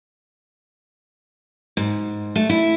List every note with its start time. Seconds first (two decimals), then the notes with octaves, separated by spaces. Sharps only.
1.77 G#2
2.36 A3
2.49 E4